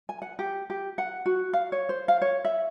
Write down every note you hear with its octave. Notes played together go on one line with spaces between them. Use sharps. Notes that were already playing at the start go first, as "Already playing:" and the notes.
G#5
F#5
G4
G4
F#5
F#4
F5
C#5
C5
F5
C#5
E5